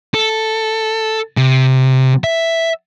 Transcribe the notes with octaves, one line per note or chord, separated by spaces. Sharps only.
A4
C3
E5